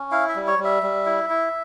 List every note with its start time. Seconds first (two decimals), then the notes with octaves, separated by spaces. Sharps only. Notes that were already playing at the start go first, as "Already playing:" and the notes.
Already playing: C#4
0.11 E4 F5
0.29 E5
0.35 G3
0.47 C#5
0.59 G3
0.64 E5
0.83 G3
1.06 E4
1.30 E4